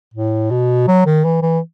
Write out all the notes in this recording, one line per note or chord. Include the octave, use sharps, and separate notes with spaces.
A2
B2
F#3
D#3
E3
E3